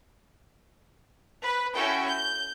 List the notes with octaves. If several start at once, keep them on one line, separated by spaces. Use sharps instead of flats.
B4
C#4 E4 F#4 A4 G5
G6